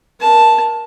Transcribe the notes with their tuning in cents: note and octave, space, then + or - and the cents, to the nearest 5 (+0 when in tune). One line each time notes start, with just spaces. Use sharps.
A#4 +25 A5 +0